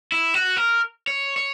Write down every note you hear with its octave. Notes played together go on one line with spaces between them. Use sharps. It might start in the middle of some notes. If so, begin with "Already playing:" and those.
E4
F#4
A#4
C#5
C#5